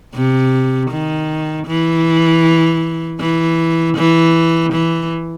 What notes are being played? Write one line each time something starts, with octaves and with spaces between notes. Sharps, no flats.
C3
D#3
E3
E3
E3
E3